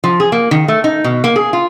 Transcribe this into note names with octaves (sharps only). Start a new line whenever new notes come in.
F3
G#4
A#3
D#3
A3
D#4
B2
A#3
G#4
F4